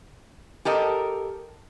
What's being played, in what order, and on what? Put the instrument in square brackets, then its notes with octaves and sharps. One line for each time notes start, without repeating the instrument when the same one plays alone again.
[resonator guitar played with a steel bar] G4 A4 A#4 D#5